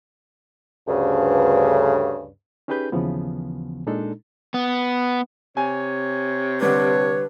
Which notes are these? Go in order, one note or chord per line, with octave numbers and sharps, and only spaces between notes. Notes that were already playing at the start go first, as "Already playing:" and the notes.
D2 G2 C#3
C#4 D#4 G4 G#4 B4 G6
D#2 C#3 E3 F3 B3
A#2 G#3 D4 D#4 A4
B3
C3 C#5 G#5
D3 G3 D4 B4 C#5